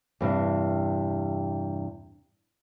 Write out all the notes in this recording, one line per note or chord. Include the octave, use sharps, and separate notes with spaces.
E2 G2 C3